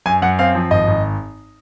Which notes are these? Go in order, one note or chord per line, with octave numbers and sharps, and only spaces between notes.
F#2 G#5
F#2 F#5
C4 F5
F3
G#1 D#5
G#1